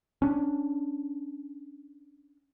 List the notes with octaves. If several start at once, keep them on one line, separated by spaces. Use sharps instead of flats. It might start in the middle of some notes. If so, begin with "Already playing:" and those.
C#4 D4